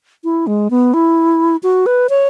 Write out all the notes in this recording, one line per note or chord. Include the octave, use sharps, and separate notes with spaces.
E4
G#3
B3
E4
F#4
B4
C#5